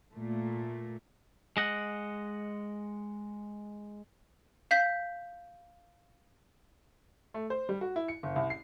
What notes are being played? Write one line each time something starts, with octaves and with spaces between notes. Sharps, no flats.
A#2 A3
G#3 D#5 F#5
F5 G6 B6
A3
C5
G3
F#4
E4
C#7
F#1
C2
C7